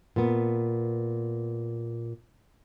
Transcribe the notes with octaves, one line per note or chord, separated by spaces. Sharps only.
A#2 B3